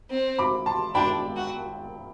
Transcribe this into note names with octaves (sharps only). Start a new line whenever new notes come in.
C4
B5 D6
A5 C6
D4 G5 B5
F#4